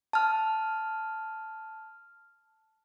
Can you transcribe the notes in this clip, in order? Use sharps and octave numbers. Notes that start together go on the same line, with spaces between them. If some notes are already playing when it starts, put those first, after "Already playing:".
A5 F6